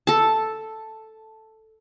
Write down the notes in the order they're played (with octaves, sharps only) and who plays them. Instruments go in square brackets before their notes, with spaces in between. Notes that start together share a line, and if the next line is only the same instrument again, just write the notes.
[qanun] A4 A5